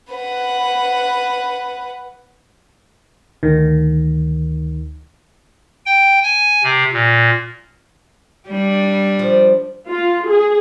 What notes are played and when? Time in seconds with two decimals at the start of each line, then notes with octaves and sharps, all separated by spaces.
0.11 B4 F#5
3.43 D2 D#3
5.86 G5
6.23 G#5
6.63 C3
6.93 A#2
8.48 G3 D4
9.19 F3
9.87 F4
10.28 G#4